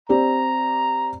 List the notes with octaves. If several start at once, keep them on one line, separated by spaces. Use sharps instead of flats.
C4 G4 D5 A#5